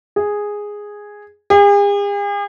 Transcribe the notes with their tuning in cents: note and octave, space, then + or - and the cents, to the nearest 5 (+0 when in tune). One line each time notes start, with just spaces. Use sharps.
G#4 -5
G#4 -45